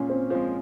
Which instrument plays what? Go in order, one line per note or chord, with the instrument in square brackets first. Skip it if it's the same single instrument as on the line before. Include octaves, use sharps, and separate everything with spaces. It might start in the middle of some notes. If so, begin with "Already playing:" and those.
Already playing: [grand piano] A#2 F3 G#3 [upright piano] C#4
[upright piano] C4
[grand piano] F3 [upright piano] C4
[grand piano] G#3